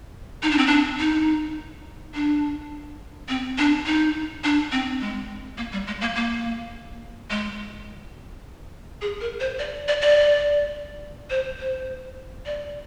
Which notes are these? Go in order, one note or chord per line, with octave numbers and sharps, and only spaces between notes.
D#4
D4
C4
D4
D#4
D4
C4
D4
D#4
D4
C4
G#3
A#3
G3
G#3
A#3
A#3
G#3
G#4
A#4
C5
D5
D5
D5
C5
C5
D5